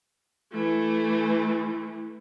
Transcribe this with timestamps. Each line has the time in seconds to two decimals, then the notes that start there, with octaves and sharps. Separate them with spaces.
0.52 E3 A3